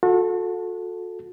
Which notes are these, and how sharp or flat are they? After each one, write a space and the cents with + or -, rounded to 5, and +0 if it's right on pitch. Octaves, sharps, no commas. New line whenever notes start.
F#4 -40 A4 +0